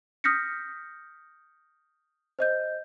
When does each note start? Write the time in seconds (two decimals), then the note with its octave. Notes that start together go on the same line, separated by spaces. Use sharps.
0.24 D#6 F6 G6 A#6 B6 C#7
2.39 C5 D#5 G6